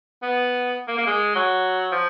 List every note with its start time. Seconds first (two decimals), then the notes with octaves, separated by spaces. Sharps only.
0.22 B3
0.88 A#3
0.98 A#3
1.07 G#3
1.35 F#3
1.92 F3